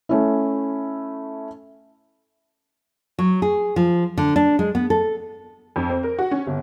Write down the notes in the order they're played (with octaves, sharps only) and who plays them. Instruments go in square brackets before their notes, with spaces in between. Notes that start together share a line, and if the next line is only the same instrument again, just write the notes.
[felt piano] A3 C#4 E4
[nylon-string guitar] F#3
G#4
F3
D3
D4
G#3
B3
A4
[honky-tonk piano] F2
C4
A#4
F#4
C#4
G1